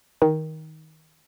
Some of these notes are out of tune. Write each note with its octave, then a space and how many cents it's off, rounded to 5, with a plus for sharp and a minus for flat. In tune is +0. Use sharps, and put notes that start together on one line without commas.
D#3 +15